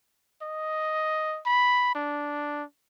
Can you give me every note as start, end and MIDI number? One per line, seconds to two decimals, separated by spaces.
0.42 1.40 75
1.46 1.90 83
1.95 2.63 62